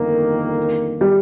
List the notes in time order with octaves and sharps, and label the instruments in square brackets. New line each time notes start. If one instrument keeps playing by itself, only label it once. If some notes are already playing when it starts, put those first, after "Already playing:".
Already playing: [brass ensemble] G1 F2 D#3 A#3
[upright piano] G3